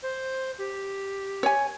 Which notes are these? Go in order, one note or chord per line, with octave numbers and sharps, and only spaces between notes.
C5
G4
C#5 G#5